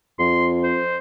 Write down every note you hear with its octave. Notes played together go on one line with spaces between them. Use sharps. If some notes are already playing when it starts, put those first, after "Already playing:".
F2 C6
C5